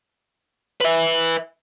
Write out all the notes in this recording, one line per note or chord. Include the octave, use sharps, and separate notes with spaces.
B4 E5